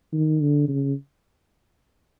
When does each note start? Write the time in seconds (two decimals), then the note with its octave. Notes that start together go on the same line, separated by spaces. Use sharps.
0.13 D#3
0.41 D3
0.68 C#3